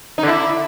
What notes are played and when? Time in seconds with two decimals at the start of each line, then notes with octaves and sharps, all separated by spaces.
0.18 D#4
0.23 D3
0.28 E4